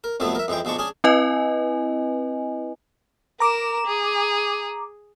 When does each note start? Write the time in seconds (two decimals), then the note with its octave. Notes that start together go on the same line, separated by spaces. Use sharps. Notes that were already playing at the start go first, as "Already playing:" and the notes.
0.04 A#4
0.20 C2 F2 F3 F#3 A3 B3
0.35 A#4 E5
0.48 F2 E3 G#3 G5
0.65 B1 F3 G#3 D4 C#6
0.79 C#4 D4 G#4
1.04 C4 E4 B4 D#5 G#5
3.40 A#4 A#5 D6 E7
3.86 G#4